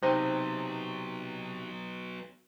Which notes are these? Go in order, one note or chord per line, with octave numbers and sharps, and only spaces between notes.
C3 F#3 B3 D#4 C5 D#5 G5